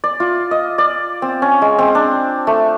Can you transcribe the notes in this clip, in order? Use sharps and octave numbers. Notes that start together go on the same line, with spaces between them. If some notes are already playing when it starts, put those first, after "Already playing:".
D5
F4
D#5
D5
C4
C#4
G#3
C4
D4
A3